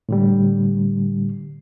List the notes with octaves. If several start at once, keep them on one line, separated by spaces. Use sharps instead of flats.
A2 D3 G3